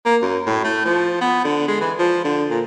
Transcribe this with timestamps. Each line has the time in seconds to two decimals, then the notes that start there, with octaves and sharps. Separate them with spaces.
0.06 A#3
0.22 F#2
0.47 A2
0.65 A3
0.85 F3
1.21 B3
1.45 D3
1.68 G#3
1.81 E3
1.99 F3
2.25 D3
2.50 A#2